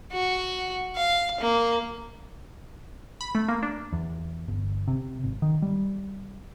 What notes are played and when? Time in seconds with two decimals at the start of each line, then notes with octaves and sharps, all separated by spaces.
0.12 F#4
0.96 F5
1.40 A#3
3.21 B5
3.35 A3
3.48 A#3
3.63 D4
3.93 E2
4.48 G1
4.88 C3
5.24 G#1
5.42 D#3
5.62 G3